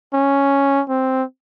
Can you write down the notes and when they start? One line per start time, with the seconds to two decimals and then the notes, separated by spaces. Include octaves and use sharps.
0.14 C#4
0.89 C4